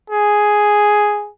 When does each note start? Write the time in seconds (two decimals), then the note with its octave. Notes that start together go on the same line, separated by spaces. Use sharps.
0.10 G#4